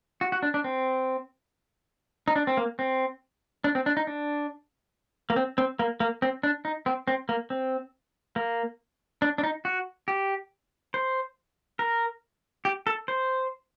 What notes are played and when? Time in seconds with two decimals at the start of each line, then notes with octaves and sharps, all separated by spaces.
0.21 F#4
0.32 F#4
0.43 D4
0.54 D4
0.64 C4
2.28 D#4
2.36 D4
2.47 C4
2.57 A#3
2.79 C4
3.64 D4
3.75 C4
3.86 D4
3.97 D#4
4.07 D4
5.30 A#3
5.36 C4
5.58 C4
5.79 A#3
6.00 A#3
6.22 C4
6.43 D4
6.65 D#4
6.86 C4
7.08 C4
7.29 A#3
7.50 C4
8.36 A#3
9.22 D4
9.38 D4
9.43 D#4
9.65 F#4
10.08 G4
10.94 C5
11.79 A#4
12.65 G4
12.87 A4
13.08 C5